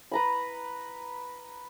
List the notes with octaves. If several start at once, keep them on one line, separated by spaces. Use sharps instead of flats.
B4 A#5 B5